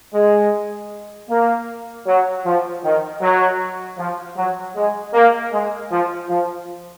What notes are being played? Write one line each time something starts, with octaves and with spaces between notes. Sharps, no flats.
G#3
A#3
F#3
F3
D#3
F#3
F3
F#3
G#3
A#3
G#3
F3
F3